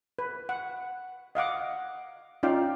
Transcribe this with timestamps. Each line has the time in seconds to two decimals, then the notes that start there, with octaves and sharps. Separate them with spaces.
0.19 B4
0.49 F#5
1.35 D#5 F5 F#5 D6
2.43 C#4 D#4 F4 D5 F5 G5